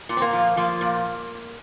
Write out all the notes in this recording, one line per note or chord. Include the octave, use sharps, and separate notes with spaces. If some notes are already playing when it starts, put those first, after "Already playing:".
A#2
C4
A#3
F3
F3 A#3
A#2